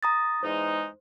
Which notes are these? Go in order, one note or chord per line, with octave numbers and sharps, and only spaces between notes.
A#5 D#6 A6
E2 G#3 D#4 C5